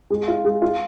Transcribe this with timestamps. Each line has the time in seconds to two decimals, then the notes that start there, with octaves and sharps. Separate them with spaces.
0.10 G#3
0.28 F4
0.44 G#3
0.62 F4